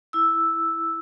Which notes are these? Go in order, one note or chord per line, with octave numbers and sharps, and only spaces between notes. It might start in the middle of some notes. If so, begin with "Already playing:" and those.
E4 E6